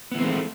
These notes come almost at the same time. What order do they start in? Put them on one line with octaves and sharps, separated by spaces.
B3 E3 C4 G#3 A3